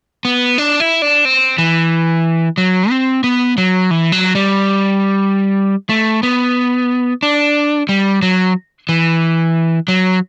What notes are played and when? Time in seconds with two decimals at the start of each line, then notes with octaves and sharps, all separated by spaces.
0.25 B3
0.58 D4
0.80 E4
1.02 D4
1.25 C4
1.58 E3
2.58 F#3
2.90 C4
3.24 B3
3.58 F#3
3.91 E3
4.12 F#3
4.35 G3
5.89 A3
6.23 B3
7.23 D4
7.89 G3
8.22 F#3
8.89 E3
9.88 F#3